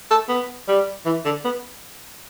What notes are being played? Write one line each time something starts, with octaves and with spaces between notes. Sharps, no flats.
A4
B3
G3
E3
D3
B3